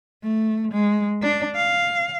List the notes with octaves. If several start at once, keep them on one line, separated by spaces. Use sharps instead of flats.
A3
G#3
D4
F5